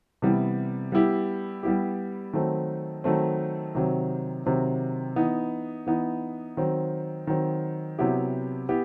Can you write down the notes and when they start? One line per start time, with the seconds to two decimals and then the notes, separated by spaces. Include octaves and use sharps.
0.22 C3 E3 G3 B3
0.92 G3 B3 E4 G4
1.63 G3 B3 E4 G4
2.33 D#3 F#3 A3 C4
3.04 D#3 F#3 A3 C4
3.75 C3 D#3 F#3 C4
4.46 C3 D#3 F#3 C4
5.16 E3 B3 D#4
5.87 E3 B3 D#4
6.57 D#3 F#3 C4
7.27 D#3 F#3 C4
7.98 C3 F#3 B3 E4 G4
8.69 B3 E4 G4